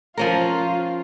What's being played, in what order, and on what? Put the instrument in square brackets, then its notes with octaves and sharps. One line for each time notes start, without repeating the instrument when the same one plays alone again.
[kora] F3 C#4 A#4 [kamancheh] F4